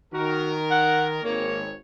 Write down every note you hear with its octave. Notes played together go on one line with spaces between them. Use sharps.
D#3 F#4 A#4
F#5
G#1 A#3 C#5